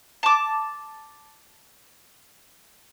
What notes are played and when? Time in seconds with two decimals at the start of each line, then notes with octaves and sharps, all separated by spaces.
0.23 A5 D6